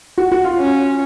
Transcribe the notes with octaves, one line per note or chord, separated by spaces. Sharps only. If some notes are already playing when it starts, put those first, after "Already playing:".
F#4
F#4
F4
C#4